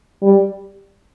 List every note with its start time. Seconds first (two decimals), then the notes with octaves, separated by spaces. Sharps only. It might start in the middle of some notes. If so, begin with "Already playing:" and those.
0.22 G3